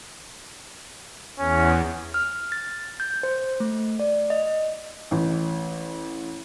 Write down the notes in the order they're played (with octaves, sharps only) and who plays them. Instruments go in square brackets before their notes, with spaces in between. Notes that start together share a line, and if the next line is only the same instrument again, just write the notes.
[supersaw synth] E2 [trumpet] C#4
[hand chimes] F6
A6
G6
C5
A3
D5
D#5
[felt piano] A1